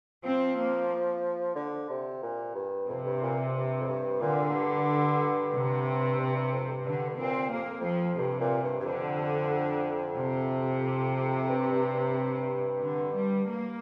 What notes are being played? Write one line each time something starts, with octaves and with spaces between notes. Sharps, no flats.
F3 C4
A#3
D3
C3
A#2
G2
F2 C3
G2
A#2
G2
F2
G2
A#2 D3
A#2
G2
C3
G2
G2
F2
G2
G2 D3
G2
A#2 C4
F2 A#3
F2
F3
G2 C3
A#2
G2
G2
F2 D3
C3
G2
G2
G2
D3
G3
A#3